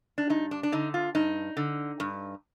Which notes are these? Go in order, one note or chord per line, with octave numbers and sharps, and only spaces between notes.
D4
G2 D#4
D4
D4
D3 D#4
F4
G2 D#4
D3
G2